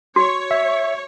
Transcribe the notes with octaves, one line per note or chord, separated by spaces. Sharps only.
F#4 C#5
E5